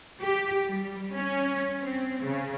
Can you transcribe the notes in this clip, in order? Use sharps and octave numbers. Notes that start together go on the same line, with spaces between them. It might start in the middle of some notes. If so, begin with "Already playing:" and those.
G4
G3
C#4
C4
C#3